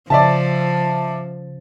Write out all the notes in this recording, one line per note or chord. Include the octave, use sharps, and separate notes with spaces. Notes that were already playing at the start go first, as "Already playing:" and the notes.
C#3 F3 D5 E5 A5